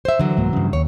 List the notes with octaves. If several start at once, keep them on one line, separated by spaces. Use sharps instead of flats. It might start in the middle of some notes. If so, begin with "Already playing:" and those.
C5 E5
D3 E3 F#3
C2 G#2 A#3
G2 C#3
D#2 C#5